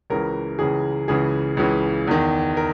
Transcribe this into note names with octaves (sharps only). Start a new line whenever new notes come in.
C#2 C#3 E3 A#4
C#2 C#3 E3 G#4
C#2 C#3 E3 G#4
C#2 C#3 E3
E2 D#3
A#4